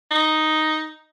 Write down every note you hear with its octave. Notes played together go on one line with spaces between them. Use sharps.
D#4